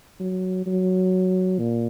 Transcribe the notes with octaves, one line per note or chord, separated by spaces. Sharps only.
F#3
F#3
A#2